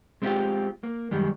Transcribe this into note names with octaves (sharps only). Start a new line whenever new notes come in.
G#3 C4 D4 E4 F4 G4
A#3
F#2 D#3 G3 G#3